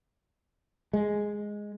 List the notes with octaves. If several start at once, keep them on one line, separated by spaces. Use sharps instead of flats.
G#3